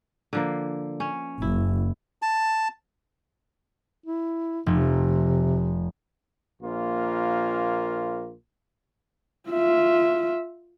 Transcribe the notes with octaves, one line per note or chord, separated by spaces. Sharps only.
D3 F3 A#3
C#4
F#1 E4
A5
E4
F1 C3
A#1 A#3 F4
F4 E5